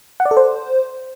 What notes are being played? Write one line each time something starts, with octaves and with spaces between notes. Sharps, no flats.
F#5
D5
A4
C5